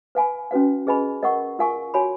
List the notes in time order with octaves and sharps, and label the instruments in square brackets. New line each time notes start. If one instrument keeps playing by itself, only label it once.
[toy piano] B4 F5 G#5 B5
C#4 F#4 B4 F5
G#4 B4 D#5 G#5 B5
A#4 D#5 F#5 C#6
F4 A#4 F5 G#5 C#6
F#4 C#5 G#5 B5